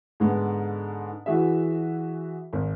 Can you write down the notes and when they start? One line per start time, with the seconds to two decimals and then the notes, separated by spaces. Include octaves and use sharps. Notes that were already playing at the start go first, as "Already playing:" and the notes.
0.20 G#2 D3 G#3 B3
1.26 E3 F#4 G#4 E5
2.53 G#1